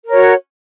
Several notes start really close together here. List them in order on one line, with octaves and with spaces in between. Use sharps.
A#4 C#5 F#4